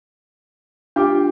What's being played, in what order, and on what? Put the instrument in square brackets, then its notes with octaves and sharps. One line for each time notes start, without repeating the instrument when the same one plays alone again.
[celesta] D4 [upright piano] F4 G4 D6